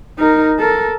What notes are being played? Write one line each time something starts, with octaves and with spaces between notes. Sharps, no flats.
D#4 A#4
A4 A#4